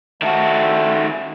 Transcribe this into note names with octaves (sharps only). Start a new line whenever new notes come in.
D#3 A3 F#4